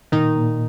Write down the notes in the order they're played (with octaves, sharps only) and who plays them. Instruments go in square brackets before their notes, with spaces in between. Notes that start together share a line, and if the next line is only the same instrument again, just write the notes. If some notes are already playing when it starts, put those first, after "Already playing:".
[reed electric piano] A#2 [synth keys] D#3 D#4
[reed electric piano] A#2